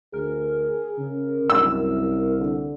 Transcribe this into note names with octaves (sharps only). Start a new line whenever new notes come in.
D2 G#4 A#4
C#3
C2 F#2 E6
D3